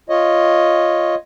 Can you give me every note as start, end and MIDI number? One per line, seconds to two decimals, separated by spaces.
0.09 1.15 65
0.09 1.15 73
0.09 1.15 75